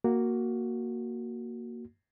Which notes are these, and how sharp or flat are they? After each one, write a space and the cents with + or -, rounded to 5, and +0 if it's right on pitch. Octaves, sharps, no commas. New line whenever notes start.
A#3 +0 F#4 +0